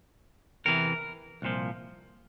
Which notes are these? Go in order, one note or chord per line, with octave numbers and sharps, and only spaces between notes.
E2 C3 E3 A#4
C2 A#2 F3